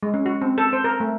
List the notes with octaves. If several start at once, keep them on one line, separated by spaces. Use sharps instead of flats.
G#3
C#4
F#4
C4
A4
C5
A#4
A3